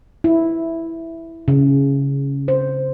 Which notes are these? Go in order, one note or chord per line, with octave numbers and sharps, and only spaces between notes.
E4
C#3
C5